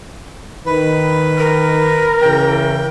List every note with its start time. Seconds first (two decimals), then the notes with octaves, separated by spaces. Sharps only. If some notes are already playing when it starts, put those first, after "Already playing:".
0.66 D#3 B4
1.38 A#4
2.22 C#3 E3 G5